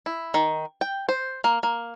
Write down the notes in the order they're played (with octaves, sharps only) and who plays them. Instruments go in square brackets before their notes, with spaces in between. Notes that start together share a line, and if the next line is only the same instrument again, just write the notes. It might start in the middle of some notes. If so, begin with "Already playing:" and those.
[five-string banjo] E4
D#3
G5
C5
A#3
A#3